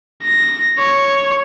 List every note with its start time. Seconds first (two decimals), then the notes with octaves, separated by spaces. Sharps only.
0.23 A#6
0.79 C#5